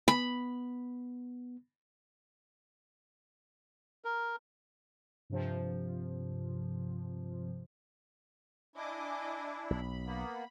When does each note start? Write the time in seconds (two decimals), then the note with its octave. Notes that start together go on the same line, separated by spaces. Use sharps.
0.08 B3 B5
4.05 A#4
5.30 G2 C3 F3
8.76 D4 E4 D#5 G#5 D6
9.70 B1 B5
10.06 A#3 B3